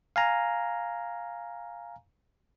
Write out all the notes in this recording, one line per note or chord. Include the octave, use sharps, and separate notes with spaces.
F5 G#5 A#5